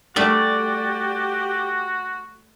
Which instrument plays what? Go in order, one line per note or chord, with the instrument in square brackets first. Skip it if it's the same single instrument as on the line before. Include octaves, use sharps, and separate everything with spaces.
[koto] G3 A3 E5 [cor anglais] F#4 [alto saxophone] G4 [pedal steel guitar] D5